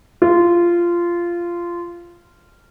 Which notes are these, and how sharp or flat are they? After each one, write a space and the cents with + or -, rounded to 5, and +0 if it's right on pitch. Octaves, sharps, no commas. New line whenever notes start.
F4 -15